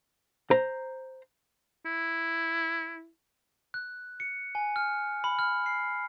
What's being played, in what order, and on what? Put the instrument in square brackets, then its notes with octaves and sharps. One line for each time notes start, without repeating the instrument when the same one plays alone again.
[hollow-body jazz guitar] C5 A#5
[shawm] E4
[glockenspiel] F#6
C#7
G#5
F6
B5
F6
C7